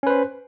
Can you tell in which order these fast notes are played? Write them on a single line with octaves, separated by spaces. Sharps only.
C#4 B4 C5